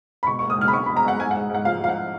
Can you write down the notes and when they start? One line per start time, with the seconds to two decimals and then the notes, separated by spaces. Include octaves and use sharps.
0.23 B5
0.27 B2 C#6
0.39 C#6
0.43 A#3
0.50 D#6
0.58 B1 F6
0.68 B5
0.73 B1 C#6
0.86 B2 B5
0.97 A#5
1.04 B1 F#5
1.19 G#2 G#5
1.31 F#5
1.35 G#2
1.50 G#2 F#5
1.65 F3 F5
1.81 F3 F5
1.89 F#5